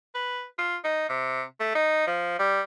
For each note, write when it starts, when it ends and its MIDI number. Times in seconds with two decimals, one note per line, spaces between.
0.15 0.44 71
0.58 0.76 65
0.84 1.07 63
1.09 1.42 48
1.60 1.71 57
1.75 2.06 63
2.07 2.38 53
2.39 2.61 55